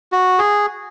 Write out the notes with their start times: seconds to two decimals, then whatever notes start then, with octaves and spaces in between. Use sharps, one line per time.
0.12 F#4
0.39 G#4